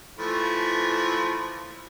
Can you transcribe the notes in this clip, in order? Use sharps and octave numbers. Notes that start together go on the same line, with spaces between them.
E3 F3 A3